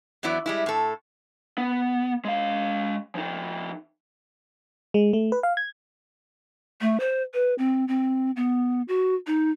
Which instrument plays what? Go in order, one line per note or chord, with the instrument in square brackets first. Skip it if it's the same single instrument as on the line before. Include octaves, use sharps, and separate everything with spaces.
[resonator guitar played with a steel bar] E2 F#3 B3 E4 D5
G3 G#3 E4
A2 A4
[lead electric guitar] B3
G#3 F5
F3 D#4
[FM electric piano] G#3
A3
B4
F5
G#6
[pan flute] A3
C5
B4
C4
C4
B3
F#4
D#4